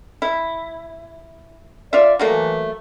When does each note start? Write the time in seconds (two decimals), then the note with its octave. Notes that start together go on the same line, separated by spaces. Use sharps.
0.22 E4
1.93 F4 D5 E5
2.19 E3 F#3 A3 A#3